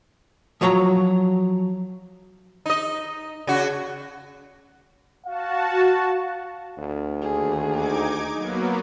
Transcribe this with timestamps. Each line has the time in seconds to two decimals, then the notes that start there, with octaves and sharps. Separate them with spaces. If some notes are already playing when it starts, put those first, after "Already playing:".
0.61 F3 F#3 C#5 D5 A#5
2.66 D#4 D#5
3.47 C#3 F#4
5.27 F#4 F5 A5
6.78 D2
7.22 D#2 G#4
7.73 D#4 D6 G#6
8.35 F#3 A#3 B3